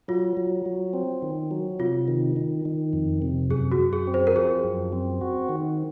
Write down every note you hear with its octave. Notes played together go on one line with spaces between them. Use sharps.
F#3 F4
F#3
F#3
C4
D#3
F#3
C3 F4
D#3
D#3
D#3
F2
C3
F#2 G#4
F#4
F#2
G#4
C4
C5
A#4
F3 G#4
F#2
C4
F#4
D#3